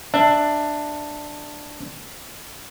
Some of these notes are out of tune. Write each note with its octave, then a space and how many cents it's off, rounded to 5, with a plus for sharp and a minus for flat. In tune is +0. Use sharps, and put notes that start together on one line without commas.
D4 +10 E5 +0